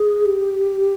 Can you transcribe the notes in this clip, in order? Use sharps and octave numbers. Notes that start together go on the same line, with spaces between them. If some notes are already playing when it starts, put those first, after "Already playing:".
Already playing: G#4
G4